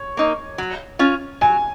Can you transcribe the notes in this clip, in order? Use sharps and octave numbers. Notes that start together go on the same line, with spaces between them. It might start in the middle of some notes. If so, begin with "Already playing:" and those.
Already playing: C#5
A#3 D#4
F#3
C#4 F4
F#3 G#5